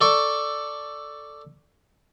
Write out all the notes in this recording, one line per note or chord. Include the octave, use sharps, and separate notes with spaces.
A4 D5 C#6